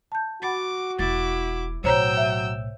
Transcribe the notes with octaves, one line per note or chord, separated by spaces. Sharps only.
A5 G6
F#4 F#5 B5 D6 A6
E1 E4 D6 A6
B1 A2 F#3 C5 C#5 G5 A#5 E6
E5